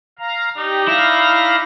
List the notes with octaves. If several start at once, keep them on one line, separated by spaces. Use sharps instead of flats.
F5 A#5
D#4 G4 D5
E4 F5 A#6